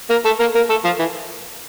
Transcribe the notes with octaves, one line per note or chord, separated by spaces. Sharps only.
A#3 A#4
A3 A4
A#3 A#4
A#3 A#4
A3 A4
F3 F4
E3